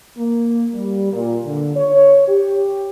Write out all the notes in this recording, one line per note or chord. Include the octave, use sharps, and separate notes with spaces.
A#3
G3
A#2
D3
C#5
G4